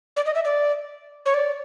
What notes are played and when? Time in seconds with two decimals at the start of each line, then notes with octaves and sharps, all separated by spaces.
0.17 D5
0.26 D#5
0.35 E5
0.45 D5
1.26 C#5
1.34 D5